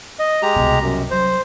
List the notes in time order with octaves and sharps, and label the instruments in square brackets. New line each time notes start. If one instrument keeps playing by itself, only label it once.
[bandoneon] D#5
G#3 G4 A#5
[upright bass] C2 B2
[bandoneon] F#2
[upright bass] F#3 [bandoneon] C5